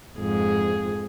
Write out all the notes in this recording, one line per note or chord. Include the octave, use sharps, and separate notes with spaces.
F2 G#2 G#4